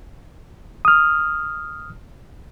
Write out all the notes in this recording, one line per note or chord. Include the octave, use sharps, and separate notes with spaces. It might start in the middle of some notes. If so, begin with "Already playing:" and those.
D#6 F6